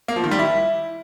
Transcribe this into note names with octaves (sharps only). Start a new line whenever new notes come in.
A#3
F3
D#3
G3
E4